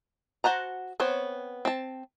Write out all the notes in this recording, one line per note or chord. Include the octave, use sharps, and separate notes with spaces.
F#4 C5 F#5 A5 A#5
B3 C4 C5 C#5
C4 A5